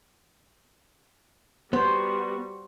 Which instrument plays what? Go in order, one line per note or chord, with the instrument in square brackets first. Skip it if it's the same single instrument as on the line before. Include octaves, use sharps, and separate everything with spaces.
[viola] G3 F#4 [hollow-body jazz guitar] B3 [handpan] C5